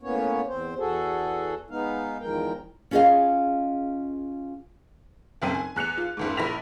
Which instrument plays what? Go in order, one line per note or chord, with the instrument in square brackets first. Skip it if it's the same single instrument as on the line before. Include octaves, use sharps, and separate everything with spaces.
[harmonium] A2 A#3 B3 C#4 C#5
E2 C4 C5
E2 F#4 G#4 A4
G#3 B3 D#4 F5
E2 D#3 F3 G#3 A#4 G5
[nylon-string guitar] C#4 F4 G#4 C5 D#5 F5
[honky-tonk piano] F#1 B1 F#2 C4 G5 D#7
G#5
E2 F#6 C#7 F7
F4
F#1 C#2 G#2
A#1 E4 B5 A#6 B6 F7